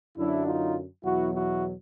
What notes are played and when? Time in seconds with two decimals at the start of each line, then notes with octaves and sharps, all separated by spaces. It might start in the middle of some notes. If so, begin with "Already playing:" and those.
0.16 F#2 D3 F#3 D4 E4
0.45 D#4 F4
1.03 E2 B2 F#3 E4 F#4
1.33 E4 F#4